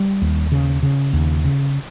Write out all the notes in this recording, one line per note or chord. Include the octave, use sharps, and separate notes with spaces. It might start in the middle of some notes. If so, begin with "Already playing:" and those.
Already playing: G3
D#2
C#3
C#3
D#2
C#3